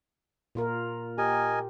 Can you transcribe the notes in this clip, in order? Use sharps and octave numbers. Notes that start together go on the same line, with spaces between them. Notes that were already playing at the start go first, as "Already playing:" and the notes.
A#2 F4 A#4
G4 A#4 D#5 G#5